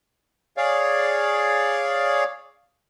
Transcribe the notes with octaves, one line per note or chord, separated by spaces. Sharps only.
G#4 C#5 D5 F5